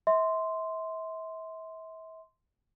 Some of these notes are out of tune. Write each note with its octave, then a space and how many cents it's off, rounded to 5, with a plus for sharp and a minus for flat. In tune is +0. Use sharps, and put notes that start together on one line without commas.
E5 -35 C6 -5